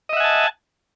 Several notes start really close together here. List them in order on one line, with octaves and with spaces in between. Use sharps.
D#5 E5 F#5 G#5 A5